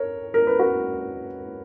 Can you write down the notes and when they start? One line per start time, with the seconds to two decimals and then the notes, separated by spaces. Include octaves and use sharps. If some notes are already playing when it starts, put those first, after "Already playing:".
Already playing: A#4 C#5
0.34 A#4
0.47 B4
0.59 F#4 A#4